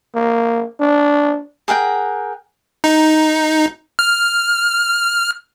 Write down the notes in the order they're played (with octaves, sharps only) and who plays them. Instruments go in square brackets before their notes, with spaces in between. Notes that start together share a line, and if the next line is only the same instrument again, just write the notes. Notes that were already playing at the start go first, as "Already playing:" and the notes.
[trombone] A#3
D4
[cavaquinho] G#4 A#4 F#5 G5
[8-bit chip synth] D#4
F6